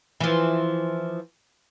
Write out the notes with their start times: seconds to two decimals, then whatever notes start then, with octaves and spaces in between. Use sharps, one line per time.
0.20 E3 F3